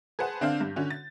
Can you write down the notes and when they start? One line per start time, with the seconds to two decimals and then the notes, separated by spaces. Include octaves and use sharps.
0.19 G#4 B4 C5 F#5 A5
0.41 D3 C4 D4 F5 G6
0.60 G2
0.76 D3 C#4 F#4
0.90 A6